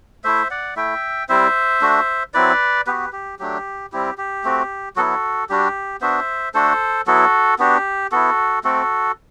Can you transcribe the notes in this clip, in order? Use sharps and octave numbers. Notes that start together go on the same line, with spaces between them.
A3 E4 C5 E5
D5 F#5
A3 E4 E5 G5
G3 C4 E4 C5 E5
A3 D4 F#4
F#3 C4 E4 B4 D5
B3 F#4 G4 B4
G4
F#3 A3 D4 G4
G3 C4 E4 G4
G4
A3 C4 F#4
F#3 B3 E4 F#4 A4
G3 D4 F#4 G4
B3 D4 F#4 C5 E5
A3 D4 F#4 A4 C5
F#3 B3 E4 F#4 A4
B3 D4 F#4 G4
B3 E4 F#4 A4
A3 C4 F#4 A4